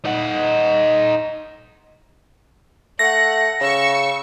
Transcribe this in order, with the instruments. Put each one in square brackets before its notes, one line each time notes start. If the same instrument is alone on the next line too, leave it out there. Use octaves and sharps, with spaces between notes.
[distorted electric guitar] D#4 F#5
[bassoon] A3 [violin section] F#5 [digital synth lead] A#6
[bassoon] C#3 [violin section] C#6 E6 C#7